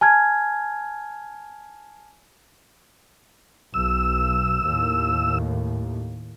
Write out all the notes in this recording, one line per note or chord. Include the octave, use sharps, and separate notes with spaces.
G#5 A5 F6 G#6
B1 E6
D#2 A2